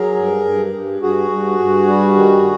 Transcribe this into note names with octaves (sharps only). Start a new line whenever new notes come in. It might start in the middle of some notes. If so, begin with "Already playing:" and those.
Already playing: F#3 G#4 A#4
G2
G2
G2
G2 F#4 G#4
G2
G2
G3
D#3